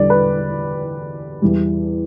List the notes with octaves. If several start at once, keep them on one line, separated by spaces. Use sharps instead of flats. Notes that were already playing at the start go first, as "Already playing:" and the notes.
Already playing: E2 D3 G3 D5
B4
E2 E3 G3